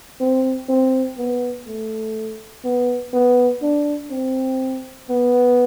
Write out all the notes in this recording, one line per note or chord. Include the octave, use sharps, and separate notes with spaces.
C4
C4
B3
A3
B3
B3
D4
C4
B3